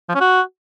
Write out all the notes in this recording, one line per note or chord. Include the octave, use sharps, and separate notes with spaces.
F3
C#4
F#4